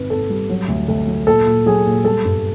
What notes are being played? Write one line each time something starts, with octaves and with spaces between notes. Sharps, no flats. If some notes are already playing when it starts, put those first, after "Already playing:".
Already playing: G#1 D#3 B4
G#1 A4
G3
F#3
D2
D2 A4
F#3
A#2 A4
A#2
F#3 G#4
A#2
G3 A4
G2